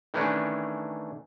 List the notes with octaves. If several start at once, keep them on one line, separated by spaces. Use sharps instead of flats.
D#3 E3 A3 C#4 D4